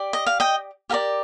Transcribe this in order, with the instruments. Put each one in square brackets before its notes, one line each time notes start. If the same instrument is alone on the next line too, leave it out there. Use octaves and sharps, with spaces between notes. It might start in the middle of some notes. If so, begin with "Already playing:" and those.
Already playing: [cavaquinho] G4 D5
D#5
F5
D#5 G5
G4 A#4 D5 F5